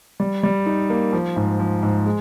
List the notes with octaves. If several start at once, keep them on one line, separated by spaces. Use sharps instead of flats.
G3
G3
D#4
A#3
F3
G#2
F3
G#2
G#3